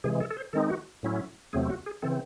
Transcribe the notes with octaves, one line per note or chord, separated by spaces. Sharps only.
C3 E3 G#3 G#4
A4
A4
C5
D#3 G#3 C4 D#4 A4
F#4
A2 F#3 C#4 E4
E2 C3 F#3 A3 C4 G#4
F#4
G#4
C#3 E3 C4 A4